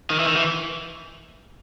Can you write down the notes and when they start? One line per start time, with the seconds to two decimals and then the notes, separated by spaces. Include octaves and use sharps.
0.10 D#3
0.19 E3
0.28 D#3
0.36 E3